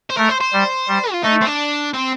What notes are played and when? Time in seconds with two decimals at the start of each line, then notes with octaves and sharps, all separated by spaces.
0.10 C5
0.18 A3 A#4
0.29 C5
0.41 C5
0.53 G3
0.88 G3
1.11 F4
1.23 A3 D#4
1.41 C4
1.46 D4
1.93 C4